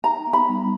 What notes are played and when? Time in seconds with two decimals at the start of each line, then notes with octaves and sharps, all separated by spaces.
0.04 D#4 A#5
0.27 B3
0.33 B5
0.49 G3